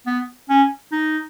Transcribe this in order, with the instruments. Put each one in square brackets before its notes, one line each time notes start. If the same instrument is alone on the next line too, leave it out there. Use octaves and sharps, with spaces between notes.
[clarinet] B3
C#4
D#4